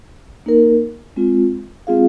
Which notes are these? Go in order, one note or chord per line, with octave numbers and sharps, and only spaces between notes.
A#3 D#4 A#4
G#3 C4 F4
G#3 C4 F4 G#4 F5